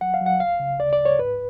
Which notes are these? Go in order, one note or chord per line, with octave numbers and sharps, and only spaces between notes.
F#3 F#5
F5
F#3
F#5
C#2 F5
C#3
D2 D5
D5
D2
C#5
G#2 B4